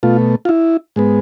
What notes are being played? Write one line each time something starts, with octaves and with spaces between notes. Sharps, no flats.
B2 A3 F4
F4
E4
G#2 G#3 B3